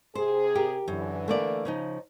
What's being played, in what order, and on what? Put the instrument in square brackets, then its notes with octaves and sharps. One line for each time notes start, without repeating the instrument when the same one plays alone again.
[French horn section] C3 G#4 [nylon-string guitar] C5
[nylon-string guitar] G4 A#4
[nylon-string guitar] F#2 [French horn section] D3 E3
[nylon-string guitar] A3 A#3 D5
C#3 F3 D#4